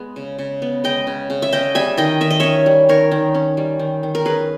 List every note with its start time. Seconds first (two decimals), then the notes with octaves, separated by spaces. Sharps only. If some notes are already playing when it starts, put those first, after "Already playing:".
Already playing: G#3 B3
0.16 C#3
0.39 C#3
0.62 B3
0.84 G#3 D#5 G5
1.07 C#3
1.30 C#3
1.42 E5
1.53 C#4 D#5 G5
1.75 G3 E5 G#5
1.97 D#3 D#5 G5
2.21 D#3 E5
2.31 D#5
2.40 C#4 C#5 E5
2.66 G3
2.89 D#3 A#4 C#5
3.11 D#3
3.35 C#4
3.57 G3
3.79 D#3
4.03 D#3
4.15 A#4
4.25 C#4 G#4 B4